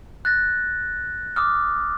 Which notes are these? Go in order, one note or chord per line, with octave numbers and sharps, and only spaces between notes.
F#6 A6 A#6
D6 D#6 F6